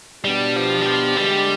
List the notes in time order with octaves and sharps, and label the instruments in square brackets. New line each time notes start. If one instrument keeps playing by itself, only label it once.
[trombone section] B2 B3 D4 G4 [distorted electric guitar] G3
[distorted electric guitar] F3
G3
F3
[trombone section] D3 G#3 D4 G4 [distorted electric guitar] G3